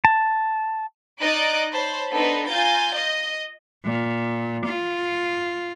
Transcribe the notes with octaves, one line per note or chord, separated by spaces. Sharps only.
A5
D#4 D5 D#5 F#6 A6 D7
C5 C#5 A5 B5
B3 D4 D#4 A4 B4 C5
F4 G#5 A#5 G6 A6
D#5
A#2
F4